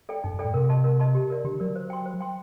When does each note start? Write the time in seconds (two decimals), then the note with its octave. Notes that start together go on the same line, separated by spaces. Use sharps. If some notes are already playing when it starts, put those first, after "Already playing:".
0.09 A4 D5 G5
0.24 G2 D#4
0.34 G2
0.39 A2 A4 D5 G5
0.53 C3 A#4
0.69 D#5 A5 C6
0.84 A#4
1.00 D#5 A5 C6
1.15 G4
1.30 A#4 D5
1.44 D3 G4
1.60 F#3 A#4 D5
1.75 C5
1.90 G5 C6
2.06 C5
2.21 G5 C6